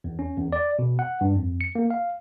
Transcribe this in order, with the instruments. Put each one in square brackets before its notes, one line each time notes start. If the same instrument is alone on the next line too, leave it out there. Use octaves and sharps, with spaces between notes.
[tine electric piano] E2
C#4
E2
D5
B2
F#5
G2
F2
C#7
A#3
F5